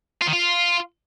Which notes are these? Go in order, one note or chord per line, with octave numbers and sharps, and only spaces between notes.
F4
D#3
F4